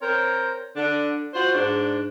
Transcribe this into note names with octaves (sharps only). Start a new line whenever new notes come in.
C4 A#4 C5 C#5
D3 D4
F4 F#4 C5
G#2 D4